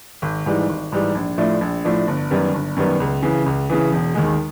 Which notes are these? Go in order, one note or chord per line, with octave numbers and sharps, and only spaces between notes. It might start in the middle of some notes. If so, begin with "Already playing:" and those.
G#1
G#2 E3 G3
G#1
G#2 E3 G3
A#1
A2 F3 A3 D4
A#1
A2 F3 A3 D4
G1
F#2 D#3 G3 B3
G1
F#2 D#3 G3 B3
C#2
C#3 E3
C#2
C#3 E3
E1
D#2 D#3 G#3